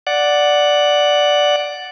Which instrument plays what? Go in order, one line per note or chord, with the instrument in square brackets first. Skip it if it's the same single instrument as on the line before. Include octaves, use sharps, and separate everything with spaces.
[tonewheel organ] D5 F#5